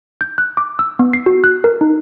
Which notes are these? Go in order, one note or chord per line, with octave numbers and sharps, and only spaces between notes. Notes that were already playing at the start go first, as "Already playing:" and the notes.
G6
F#6
D6
E6
B3
C7
F#4
F#6
A#4
D#4